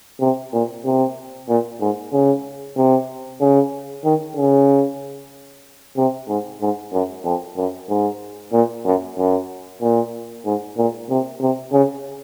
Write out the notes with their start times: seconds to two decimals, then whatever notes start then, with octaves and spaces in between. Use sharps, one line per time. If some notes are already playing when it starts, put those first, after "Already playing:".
0.21 C3
0.53 A#2
0.85 C3
1.48 A#2
1.80 G#2
2.13 C#3
2.77 C3
3.41 C#3
4.05 D#3
4.36 C#3
5.97 C3
6.28 G#2
6.61 G#2
6.92 F#2
7.24 F2
7.56 F#2
7.89 G#2
8.52 A#2
8.85 F#2
9.17 F#2
9.81 A#2
10.45 G#2
10.78 A#2
11.10 C3
11.41 C3
11.73 C#3